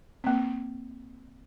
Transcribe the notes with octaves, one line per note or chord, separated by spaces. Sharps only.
A#3 C4